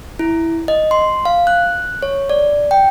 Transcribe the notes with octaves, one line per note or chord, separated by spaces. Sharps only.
E4
D#5
C6
F5
F#6
C#5
D5
G5